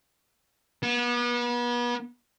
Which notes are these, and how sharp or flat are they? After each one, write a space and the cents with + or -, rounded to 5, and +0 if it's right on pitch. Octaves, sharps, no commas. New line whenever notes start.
B3 -35